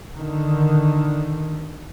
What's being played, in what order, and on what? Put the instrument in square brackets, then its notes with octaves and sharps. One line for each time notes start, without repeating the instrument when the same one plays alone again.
[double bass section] D3 D#3